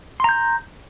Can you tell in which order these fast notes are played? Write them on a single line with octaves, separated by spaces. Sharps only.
C6 A#5 G6